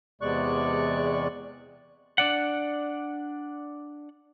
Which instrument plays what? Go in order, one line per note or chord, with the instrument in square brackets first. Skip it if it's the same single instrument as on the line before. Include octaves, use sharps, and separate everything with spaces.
[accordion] E2 C3 G#3 D5 C#6 F#6
[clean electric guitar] D4 D5 F#5